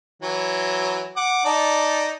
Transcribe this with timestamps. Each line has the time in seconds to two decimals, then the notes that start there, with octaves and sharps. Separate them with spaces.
0.22 E3 F#3
1.17 F#5 D6
1.45 D#4 D5 A5